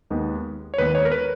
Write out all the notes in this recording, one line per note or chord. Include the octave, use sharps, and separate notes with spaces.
D#2 D#3 G#3 B3
C#5
D#2 D#3 G#3 B3 B4
C#5
A#4
B4